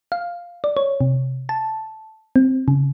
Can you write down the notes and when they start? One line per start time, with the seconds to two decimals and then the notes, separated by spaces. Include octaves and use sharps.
0.12 F5
0.64 D5
0.77 C#5
1.01 C3
1.49 A5
2.36 C4
2.68 C#3